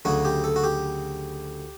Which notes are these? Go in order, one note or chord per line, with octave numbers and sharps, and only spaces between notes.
D2 C#3 F#3 F#4
G4
A4
F#4
G4